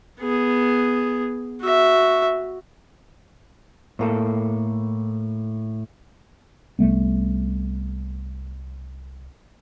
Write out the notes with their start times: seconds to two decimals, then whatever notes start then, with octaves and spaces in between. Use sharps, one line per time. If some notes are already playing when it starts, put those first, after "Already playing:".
0.20 B3 G#4
1.62 F#4 E5
3.99 A2 A#3 A4
6.79 C2 G3 A3 B3